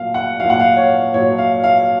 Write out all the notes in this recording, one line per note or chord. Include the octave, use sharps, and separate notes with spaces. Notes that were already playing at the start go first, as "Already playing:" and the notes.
Already playing: A#2 F#3 F5
F#5
A#2 F#3 F5
F#5
F5
C#5
A#2 F#3 C#5
F5
F5